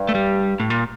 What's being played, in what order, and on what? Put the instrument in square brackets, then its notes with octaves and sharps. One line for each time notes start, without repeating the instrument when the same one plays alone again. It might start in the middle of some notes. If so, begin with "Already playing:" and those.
Already playing: [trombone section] G2
[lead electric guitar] A3
G3
A2
A#2